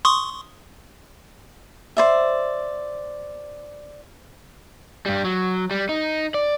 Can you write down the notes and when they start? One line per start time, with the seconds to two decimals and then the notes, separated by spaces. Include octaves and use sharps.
0.05 C6 C#6 D#6
1.97 C5 D5 E5
5.06 G2 G3
5.25 F#3
5.71 G3
5.89 D#4
6.34 D5